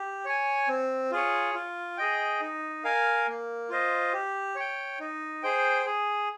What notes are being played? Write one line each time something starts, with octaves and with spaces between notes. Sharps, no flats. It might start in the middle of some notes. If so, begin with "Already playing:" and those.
Already playing: G4
C#5 G#5
C4
F4 G#4 C#5
F4
G#4 D#5 G5
D#4
A#4 F5 G#5
A#3
F4 C5 D#5
G4
C#5 G5
D#4
G#4 C5 G5
G#4